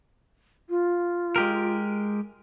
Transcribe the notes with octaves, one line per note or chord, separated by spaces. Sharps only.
F4
G#3 G4 A#4